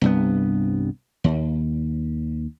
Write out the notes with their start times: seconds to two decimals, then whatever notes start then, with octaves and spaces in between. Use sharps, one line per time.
0.01 C2 G2 B3
1.24 D#2